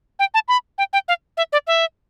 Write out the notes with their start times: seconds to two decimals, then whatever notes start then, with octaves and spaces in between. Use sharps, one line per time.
0.19 G5
0.34 A5
0.48 B5
0.78 G5
0.93 G5
1.08 F5
1.37 E5
1.52 D5
1.67 E5